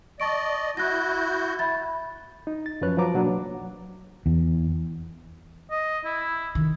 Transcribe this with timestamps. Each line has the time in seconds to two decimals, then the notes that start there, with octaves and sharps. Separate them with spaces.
0.20 D5 D#5 A5 C#6 D7
0.77 E4 F#4 F#6 G6 A#6
1.59 E5 B5 A6
2.47 D#4
2.66 A6
2.81 F#2 F3 C#4 B4 C#5 F#6
2.97 F3 F#3 B4 A#5 D6
3.14 B2 F#3 A#3 D4
4.26 E2
5.71 D#5
6.05 E4
6.55 D#3